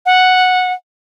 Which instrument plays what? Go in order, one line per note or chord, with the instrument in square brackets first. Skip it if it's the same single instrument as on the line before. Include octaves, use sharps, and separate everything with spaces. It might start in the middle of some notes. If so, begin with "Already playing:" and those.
[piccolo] F#5